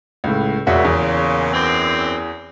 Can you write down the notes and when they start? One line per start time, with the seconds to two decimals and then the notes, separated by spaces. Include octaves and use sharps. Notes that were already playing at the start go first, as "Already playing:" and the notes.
0.24 C#2 A2
0.67 E1 A#2 C#3 F#4 E5
0.85 E2
1.53 F#2 E3 C4